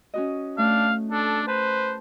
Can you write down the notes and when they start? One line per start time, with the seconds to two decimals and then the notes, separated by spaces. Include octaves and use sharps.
0.14 C#4 F#4 D#5
0.58 A3 D4 F5
1.11 D4 A4
1.48 B4 C5 A5